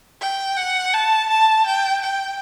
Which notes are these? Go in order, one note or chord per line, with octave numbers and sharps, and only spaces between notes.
G5
F#5
A5
A5
G5
G5